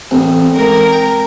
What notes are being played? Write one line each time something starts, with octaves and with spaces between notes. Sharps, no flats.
A1 E2 C4 A4
G#2 A#4
G5